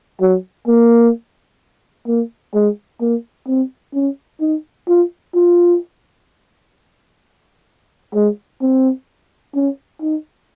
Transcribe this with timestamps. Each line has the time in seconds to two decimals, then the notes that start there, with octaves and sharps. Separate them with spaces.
0.21 F#3
0.67 A#3
2.07 A#3
2.54 G#3
3.01 A#3
3.47 C4
3.94 C#4
4.40 D#4
4.88 F4
5.34 F4
8.14 G#3
8.61 C4
9.55 C#4
10.01 D#4